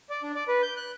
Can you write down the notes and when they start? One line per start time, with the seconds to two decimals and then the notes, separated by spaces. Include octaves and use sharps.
0.10 D5
0.23 D4
0.35 D5
0.48 B4
0.63 G6
0.77 F#6